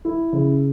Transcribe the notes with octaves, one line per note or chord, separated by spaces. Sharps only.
E4
C#3